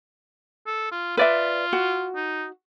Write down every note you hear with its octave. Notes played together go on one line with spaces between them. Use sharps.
A4
F4
F4 B4 D5 E5
F#4
D#4